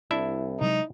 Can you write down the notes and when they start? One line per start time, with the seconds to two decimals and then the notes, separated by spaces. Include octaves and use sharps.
0.11 C2 D4 E4 E5
0.61 C3 F#3 G#3 D#4